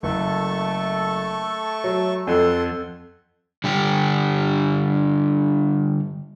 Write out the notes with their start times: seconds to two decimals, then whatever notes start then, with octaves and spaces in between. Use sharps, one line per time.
0.03 F#1 A3 A4 C#6
1.84 F#3
2.27 F2 A4 F#5 C6
3.64 D3 G3 D4 G4